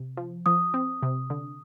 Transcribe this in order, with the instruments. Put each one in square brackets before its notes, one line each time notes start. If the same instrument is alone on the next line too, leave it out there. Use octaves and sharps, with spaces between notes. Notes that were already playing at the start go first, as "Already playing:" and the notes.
Already playing: [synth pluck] C3
F3
[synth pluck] F3 [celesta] D#6
[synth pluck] C4
C3
D3